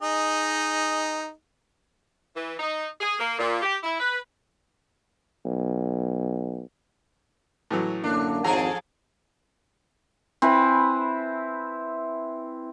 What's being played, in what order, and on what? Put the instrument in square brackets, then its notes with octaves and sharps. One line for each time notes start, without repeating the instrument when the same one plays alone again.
[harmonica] D#4 G#4 D#5
[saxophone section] E3
D#4
G#4
A#3
A#2
G4
E4
B4
[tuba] B1
[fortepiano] A2 E3 F#3
[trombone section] F#2 D3 A#3 [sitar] D4
[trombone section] G#1 F2 [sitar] F3 G#4 A4 [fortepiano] A#5
[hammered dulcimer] C4 E4 B4 G#5